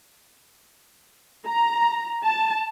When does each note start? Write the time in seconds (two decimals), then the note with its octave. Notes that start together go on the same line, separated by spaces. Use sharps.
1.47 A#5
2.24 A5